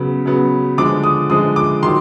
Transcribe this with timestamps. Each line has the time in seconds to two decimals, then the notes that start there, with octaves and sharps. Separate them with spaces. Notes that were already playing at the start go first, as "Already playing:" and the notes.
Already playing: C#3 F#3 B3
0.26 C#3 F#3 B3
0.78 D3 F3 G#3 D6
1.04 D#6
1.30 D3 F3 G#3 D#6
1.56 D6
1.83 D#3 F#3 C6